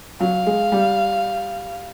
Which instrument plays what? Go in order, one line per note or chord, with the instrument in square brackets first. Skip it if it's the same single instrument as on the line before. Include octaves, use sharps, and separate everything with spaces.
[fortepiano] F#3 [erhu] F5
[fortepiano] G#3
G3